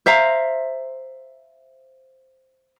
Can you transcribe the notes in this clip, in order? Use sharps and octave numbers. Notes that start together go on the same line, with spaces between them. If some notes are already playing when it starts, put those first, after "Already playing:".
C5 E5 F5 A#5